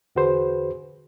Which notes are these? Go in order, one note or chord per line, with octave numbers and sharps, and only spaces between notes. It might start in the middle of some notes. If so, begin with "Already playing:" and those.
E2 D3 F#4 G#4 B4 C5